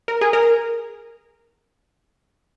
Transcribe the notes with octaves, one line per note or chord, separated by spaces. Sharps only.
A#4
G#4
A#4